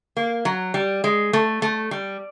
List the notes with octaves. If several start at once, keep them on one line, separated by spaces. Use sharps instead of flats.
A#3
F#3
G3
G#3
A3
A3
G3